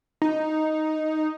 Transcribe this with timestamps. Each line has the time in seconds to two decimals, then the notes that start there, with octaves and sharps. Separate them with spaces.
0.22 D#4